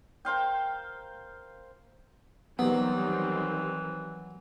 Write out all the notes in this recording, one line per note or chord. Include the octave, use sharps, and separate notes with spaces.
A#4 C5 F5 G5
D#3 E3 F#3 G3 B3 C4